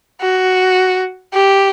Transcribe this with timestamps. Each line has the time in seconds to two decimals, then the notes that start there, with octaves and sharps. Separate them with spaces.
0.21 F#4
1.34 G4